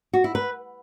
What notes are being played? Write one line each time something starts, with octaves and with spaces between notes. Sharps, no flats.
F#4
E4
B4